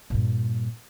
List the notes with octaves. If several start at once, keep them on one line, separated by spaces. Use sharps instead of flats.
G2 A#2